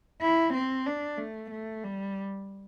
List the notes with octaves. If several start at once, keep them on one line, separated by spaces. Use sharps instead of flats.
E4
C4
D4
A3
A3
G3